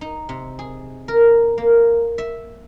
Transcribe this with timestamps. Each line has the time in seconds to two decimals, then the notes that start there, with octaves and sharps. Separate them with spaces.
0.01 D#4
0.29 C3
0.59 G#4
1.08 A#4
1.58 A#3
2.18 E5